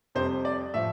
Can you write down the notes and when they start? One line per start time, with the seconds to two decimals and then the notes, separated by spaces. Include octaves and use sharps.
0.15 F2 C3 G3 C5
0.45 D5
0.74 A2 F3 E5